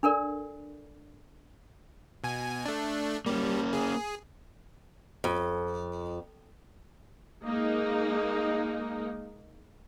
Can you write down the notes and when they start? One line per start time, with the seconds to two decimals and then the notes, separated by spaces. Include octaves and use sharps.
0.03 D4 A4 A#4 D5
2.24 B2 G#5
2.65 A3 D4
3.26 G3 A#3 C#4
3.73 G#4
5.24 F2
7.44 G#3 A#3 D#4